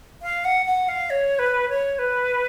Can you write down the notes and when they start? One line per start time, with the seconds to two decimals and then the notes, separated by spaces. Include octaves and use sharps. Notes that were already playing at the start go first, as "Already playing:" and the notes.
0.22 F5
0.45 F#5
0.66 F#5
0.88 F5
1.10 C#5
1.39 B4
1.69 C#5
1.99 B4